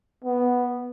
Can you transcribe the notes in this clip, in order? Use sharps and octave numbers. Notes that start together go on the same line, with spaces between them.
B3